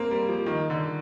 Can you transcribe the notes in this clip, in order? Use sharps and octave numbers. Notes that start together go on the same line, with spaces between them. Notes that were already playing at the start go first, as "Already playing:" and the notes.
Already playing: A#3 C4
G3
F3
D#3
D3